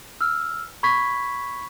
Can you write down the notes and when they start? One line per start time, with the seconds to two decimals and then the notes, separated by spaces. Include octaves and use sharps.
0.21 E6 F6
0.83 B5 C#6 G#6 B6